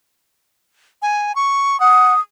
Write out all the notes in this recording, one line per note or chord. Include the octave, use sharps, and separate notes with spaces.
G#5
C#6
F#5 D#6